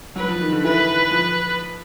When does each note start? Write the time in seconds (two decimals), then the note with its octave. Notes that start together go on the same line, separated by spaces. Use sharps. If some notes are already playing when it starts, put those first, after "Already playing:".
0.16 F#3 B4
0.28 F3
0.41 D#3
0.52 D3
0.65 E3 B4
1.11 F3